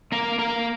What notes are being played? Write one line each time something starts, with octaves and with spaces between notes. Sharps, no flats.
A#3 A#4
A#3 A#4